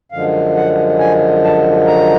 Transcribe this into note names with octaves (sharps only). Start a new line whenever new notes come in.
F#2 D3 F3 G#3 F5
F#5
G#5
A5
A#5